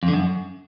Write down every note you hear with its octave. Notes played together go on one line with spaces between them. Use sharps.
F2
D3
F#2